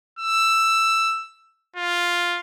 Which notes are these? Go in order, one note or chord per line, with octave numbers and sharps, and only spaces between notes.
E6
F4